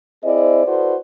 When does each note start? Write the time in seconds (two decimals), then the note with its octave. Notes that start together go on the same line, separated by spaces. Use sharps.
0.24 C4 E4 G#4 C5 D5 D#5
0.66 E4 F#4 A4 B4 C5 D5